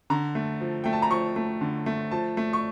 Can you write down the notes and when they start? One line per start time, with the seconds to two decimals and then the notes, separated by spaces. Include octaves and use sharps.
0.10 D3 A#5
0.35 A3
0.61 F3
0.84 A3 G5
0.93 A5
1.02 A#5
1.11 F3 C#6
1.36 A3
1.61 D3
1.86 A3
2.11 F3 A5
2.37 A3
2.53 C#6